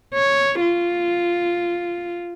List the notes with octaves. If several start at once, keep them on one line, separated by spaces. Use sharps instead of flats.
C#5
F4